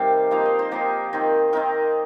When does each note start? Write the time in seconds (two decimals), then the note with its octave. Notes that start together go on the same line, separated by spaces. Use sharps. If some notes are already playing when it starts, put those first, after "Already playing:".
Already playing: C3 D#3 G3 F5 G5
0.31 F3 A#3 D#4 F5
0.45 D#5
0.59 C5
0.71 F3 A#3 D#4 G4
1.13 D#3 C4 D#4
1.53 D#3 C4 D#4 A#4